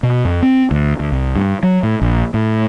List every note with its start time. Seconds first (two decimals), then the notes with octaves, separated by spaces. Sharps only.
0.03 B2
0.25 F2
0.42 C4
0.71 D2
1.00 D2
1.12 C2
1.35 G2
1.63 F#3
1.83 A2
2.02 A#1
2.34 A2